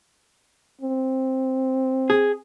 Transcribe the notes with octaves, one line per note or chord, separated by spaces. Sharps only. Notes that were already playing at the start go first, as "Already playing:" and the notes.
C4
G#4